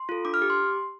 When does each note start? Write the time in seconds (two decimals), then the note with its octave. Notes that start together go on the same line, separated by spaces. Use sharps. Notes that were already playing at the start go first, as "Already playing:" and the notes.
Already playing: C6
0.09 F4 A4
0.25 D4 D6
0.34 F6
0.42 G4 D6
0.50 C6